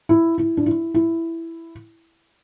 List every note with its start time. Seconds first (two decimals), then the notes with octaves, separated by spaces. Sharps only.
0.09 E4
0.38 E4
0.57 D4
0.66 E4
0.94 E4